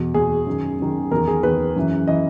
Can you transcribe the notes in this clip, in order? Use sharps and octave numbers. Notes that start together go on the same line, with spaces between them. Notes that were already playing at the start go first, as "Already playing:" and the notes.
Already playing: E2 B2
E2 B2 G#4
F#2 D#3
F#2 D#3
E2 D#3 A#4
G#4
E2 D#3 B4
F#2 E3
E3 D#5